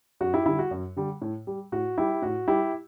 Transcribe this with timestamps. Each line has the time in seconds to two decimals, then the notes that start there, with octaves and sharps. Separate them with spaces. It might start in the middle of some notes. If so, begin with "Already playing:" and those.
0.21 F#2 F#4
0.33 E4 G4
0.46 D3 G3 E4
0.59 F#4
0.71 F#2
0.96 D3 G3
1.21 A2
1.47 G3
1.72 A2 F#4
1.98 G3 E4 G4
2.22 A2 F#4
2.47 G3 E4 G4